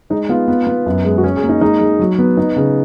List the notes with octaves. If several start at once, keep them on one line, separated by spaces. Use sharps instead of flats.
G#3 D#4
B3 F4
B3
B3
F#2
G#3
F#4
C#4 G#4
G#4
A#3
D#4
G#3 D#4
G#3
F#3
B3
B3 D#4
C#3